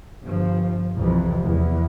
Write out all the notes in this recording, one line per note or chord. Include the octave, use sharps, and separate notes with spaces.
G1 F3
C2 F2 C3 E3 F3
E2